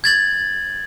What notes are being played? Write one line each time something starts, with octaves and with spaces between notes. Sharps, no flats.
G#6 A6 F#7